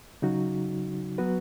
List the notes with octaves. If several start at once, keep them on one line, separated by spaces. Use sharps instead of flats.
C#3 F#3 D#4 F#4
F#3 B3 F#4 B4